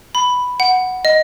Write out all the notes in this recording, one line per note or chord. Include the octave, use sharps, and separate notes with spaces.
B5
F#5
D#5